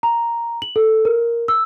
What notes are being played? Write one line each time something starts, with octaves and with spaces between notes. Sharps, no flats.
A#5
F#7
A4
A#4
E6